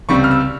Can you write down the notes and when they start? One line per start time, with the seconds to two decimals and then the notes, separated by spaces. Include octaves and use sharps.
0.09 C#2 C3 G3 C4 C#6
0.24 F6
0.31 E6